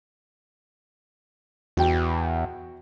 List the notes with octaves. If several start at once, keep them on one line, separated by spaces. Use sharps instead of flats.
E2 F#4 G5